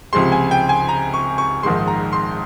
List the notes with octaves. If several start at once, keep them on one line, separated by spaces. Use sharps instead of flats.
C#2 C3 F3 G#3 C6
G#5
G5
G#5
A#5
C#6
C#6
A#1 G#2 D#3 G#3 C6
A#5
C6